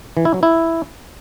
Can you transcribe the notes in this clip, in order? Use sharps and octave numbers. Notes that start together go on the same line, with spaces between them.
E3
E4
F#3
E4